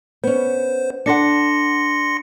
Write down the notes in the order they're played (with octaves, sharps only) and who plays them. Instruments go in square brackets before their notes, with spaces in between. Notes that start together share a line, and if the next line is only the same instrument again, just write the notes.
[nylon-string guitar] B3 C#4 [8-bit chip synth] C5
[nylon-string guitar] D4 A4 F#5 [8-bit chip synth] C6 A#6 C#7